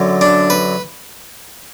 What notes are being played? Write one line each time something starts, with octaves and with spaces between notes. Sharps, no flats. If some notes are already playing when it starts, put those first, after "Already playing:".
Already playing: F#2 D3 F#3
D4
B4